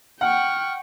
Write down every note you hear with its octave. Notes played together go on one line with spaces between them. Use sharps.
F#5 G5 C#6 F6